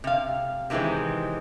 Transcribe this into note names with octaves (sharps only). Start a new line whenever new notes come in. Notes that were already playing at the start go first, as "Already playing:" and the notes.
C3 F5
C3 D#3 E3 G#3 C4